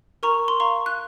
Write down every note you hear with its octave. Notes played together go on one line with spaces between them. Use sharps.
A#4 A#5 C#6
C6
F5 A#5 C#6
F#6